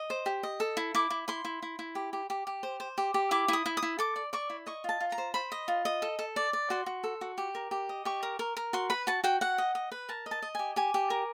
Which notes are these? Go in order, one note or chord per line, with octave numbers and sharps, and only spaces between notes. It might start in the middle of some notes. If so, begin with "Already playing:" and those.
Already playing: D#5
C5
G4
D#5
A4
E4
E4 D6
E4
E4 C6
E4
E4
E4
G4
G4
G4
G4
C5
C5
G4
G4
E4 D6
E4 D#6
E4
D#6
E4
A4 D6
D5
D5 C#6
E4
D#5 C#6
F4 A5
F4
A#5
C5
C5 B5
D#5
F4
D#5
A4
A4
D5
D5
F#4 C6
F#4
A4
F#4
G4
A#4
G4
D#5
G4 C#6
A#4
A#4
A#4
F#4 C6
B4 B5
F#4 A5
F#4 G5
F#4 F#5
D#5
D#5
B4
A#4 A5
D#5
A5
D#5
G4 G#5
G4 G#5
G4
A#4